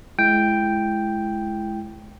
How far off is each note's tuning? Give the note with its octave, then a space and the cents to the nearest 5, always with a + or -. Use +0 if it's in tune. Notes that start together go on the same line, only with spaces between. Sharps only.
G#3 +30 E4 +15 G5 +0